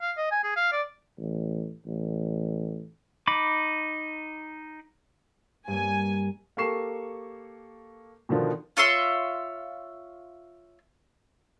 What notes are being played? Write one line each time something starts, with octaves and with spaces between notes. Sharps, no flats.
F5
D#5
G#5
G#4
F5
D5
A1
A1
D#4 B5 D6
G2 A#3 G#5
A#3 G4 A4 C#6 C7 E7
B2 D3 D#3 F3
F4 C#5 E5 C6